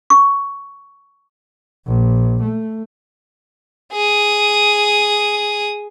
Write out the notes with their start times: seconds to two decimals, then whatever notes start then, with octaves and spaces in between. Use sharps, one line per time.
0.10 C#6
1.86 A#1
2.42 A3
3.93 G#4 D#6